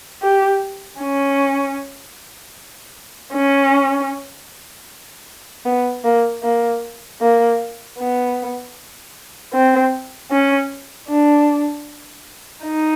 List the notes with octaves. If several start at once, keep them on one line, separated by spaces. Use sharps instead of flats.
G4
C#4
C#4
B3
A#3
A#3
A#3
B3
C4
C#4
D4
D#4